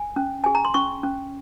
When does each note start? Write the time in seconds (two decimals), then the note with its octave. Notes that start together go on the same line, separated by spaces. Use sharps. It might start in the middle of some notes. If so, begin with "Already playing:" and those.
Already playing: G#5
0.16 C#4
0.44 G#4 G#5
0.55 A#5
0.65 C6
0.74 C#4 C#6
1.04 C#4